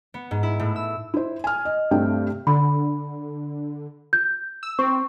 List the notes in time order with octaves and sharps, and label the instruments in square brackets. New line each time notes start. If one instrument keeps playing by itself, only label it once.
[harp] B3
G#2
E4
A2
E6
[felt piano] E4 C5
G#5 F6
D#5
G2 C3 A3 G5
[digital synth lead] D3 [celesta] B5
[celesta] G6
[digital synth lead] E6
[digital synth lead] C4 [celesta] C#6